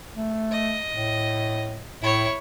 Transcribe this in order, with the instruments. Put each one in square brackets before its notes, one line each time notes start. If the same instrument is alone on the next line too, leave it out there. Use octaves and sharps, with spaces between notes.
[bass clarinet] A3
[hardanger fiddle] D#5
[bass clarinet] A2
[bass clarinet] A2 [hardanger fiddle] E4 C#5